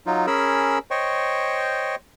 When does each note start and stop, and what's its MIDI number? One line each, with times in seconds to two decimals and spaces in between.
0.06 0.26 54
0.06 0.26 63
0.06 0.26 65
0.27 0.78 61
0.27 0.78 68
0.27 0.78 70
0.27 0.78 83
0.27 0.78 88
0.91 1.96 72
0.91 1.96 73
0.91 1.96 75
0.91 1.96 79
0.91 1.96 85